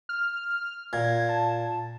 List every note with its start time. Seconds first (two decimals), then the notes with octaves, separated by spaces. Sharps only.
0.09 F6
0.93 A#2 G#6
1.29 A5